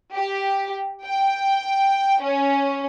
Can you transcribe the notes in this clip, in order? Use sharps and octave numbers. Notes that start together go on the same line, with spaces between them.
G4
G5
C#4